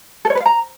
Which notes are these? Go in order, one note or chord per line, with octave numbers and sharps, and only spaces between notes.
A4
C#5
B4
F5
A#5